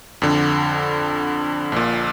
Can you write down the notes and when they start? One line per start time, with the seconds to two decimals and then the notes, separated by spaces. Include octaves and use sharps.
0.22 F2 D3
1.72 A#1 A#2